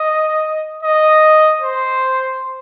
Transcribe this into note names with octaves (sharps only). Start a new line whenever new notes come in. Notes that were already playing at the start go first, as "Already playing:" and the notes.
Already playing: D#5
D#5
C5